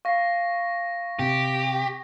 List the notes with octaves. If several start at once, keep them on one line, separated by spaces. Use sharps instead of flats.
F5 C#6 A#6 C7
C3 G4